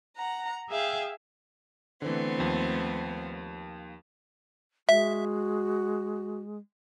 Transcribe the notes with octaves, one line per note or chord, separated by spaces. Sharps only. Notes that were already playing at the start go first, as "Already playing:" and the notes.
F#5 A#5
G#4 E5 F5 G5
D3 E3 A3 B3 C4
D#2 F3
G#3 F#4 E5